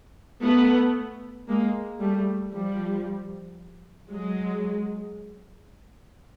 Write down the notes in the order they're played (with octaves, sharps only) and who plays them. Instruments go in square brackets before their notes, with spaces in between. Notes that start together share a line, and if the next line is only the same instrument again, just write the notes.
[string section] A3 B3
G#3 A#3
G3 A3
F3 G3
F#3 G#3